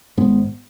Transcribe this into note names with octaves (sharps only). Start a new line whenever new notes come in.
G#1 G#2 G#3 B3